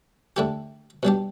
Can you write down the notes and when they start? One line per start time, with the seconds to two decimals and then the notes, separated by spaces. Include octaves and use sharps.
0.36 D3 A3 E4 G4
1.03 B2 G3 D4 G4